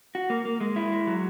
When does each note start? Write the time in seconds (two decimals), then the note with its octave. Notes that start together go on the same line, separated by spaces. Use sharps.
0.15 F#4
0.30 A#3
0.45 A#3
0.61 G#3
0.76 E4
0.92 G#3
1.07 F#3